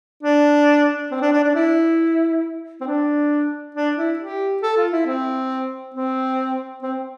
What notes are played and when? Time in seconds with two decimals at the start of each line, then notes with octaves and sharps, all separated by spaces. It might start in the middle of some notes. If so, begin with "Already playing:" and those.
0.23 D4
1.11 C4
1.22 D4
1.33 D4
1.44 D4
1.55 E4
2.81 C4
2.87 D4
3.75 D4
3.97 E4
4.19 G4
4.63 A4
4.77 F4
4.92 E4
5.07 C4
5.95 C4
6.83 C4